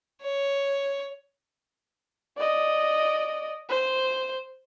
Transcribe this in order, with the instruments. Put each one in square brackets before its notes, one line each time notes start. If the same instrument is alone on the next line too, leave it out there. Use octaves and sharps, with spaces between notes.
[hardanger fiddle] C#5
[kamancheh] D5 D#5
C5